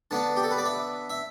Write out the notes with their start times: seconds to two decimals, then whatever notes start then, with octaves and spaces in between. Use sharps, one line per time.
0.11 D3 B3 D4 A5
0.36 G4
0.43 A4
0.51 B4
0.58 D5
0.65 E5
1.10 E5